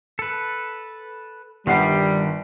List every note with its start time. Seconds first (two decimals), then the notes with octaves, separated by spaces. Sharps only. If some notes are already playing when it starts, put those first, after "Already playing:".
0.19 A4 B4
1.67 G1 D#3 G3 G4 F#5 C7